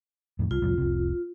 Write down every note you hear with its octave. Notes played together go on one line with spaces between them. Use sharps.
F2 A2 D#3
C2 F4
C2 F2 A2
F1 C2 C3